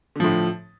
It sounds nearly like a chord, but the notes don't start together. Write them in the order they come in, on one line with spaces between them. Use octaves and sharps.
D3 F3 A2